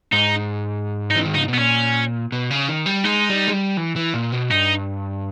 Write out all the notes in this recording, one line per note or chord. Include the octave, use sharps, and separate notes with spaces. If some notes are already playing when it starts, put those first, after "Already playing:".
G#2 D#4
D#4
E3
D#3
C#3 D#4
B2
B3
A#2 C#4
B2
C#3
D#3
G3
G#3 D#4
G3
G#3
G3
E3
E3
A#2
B2
G2 D#4